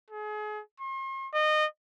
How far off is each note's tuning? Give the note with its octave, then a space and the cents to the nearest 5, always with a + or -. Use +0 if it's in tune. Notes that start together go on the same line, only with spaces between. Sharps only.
G#4 +35
C6 +45
D#5 -25